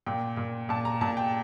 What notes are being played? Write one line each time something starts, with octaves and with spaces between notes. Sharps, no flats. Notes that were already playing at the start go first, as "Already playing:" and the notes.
A#2 G5
A#2
A#2 A5
A#5
A#2 A5
G5